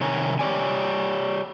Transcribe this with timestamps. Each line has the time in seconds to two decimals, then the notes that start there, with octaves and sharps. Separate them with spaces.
0.01 C3 D#3 A#4 C#5 G#5
0.39 G4 C#5 D5 G#5